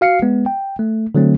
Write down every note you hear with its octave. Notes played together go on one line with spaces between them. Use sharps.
F#4 F5 C7 C#7
G#3 B3
G5
A3
D3 F#3 A3 C4